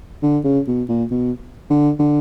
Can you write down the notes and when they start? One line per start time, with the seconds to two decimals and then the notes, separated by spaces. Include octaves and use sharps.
0.23 D3
0.44 C#3
0.68 B2
0.89 A#2
1.11 B2
1.71 D3
1.99 D3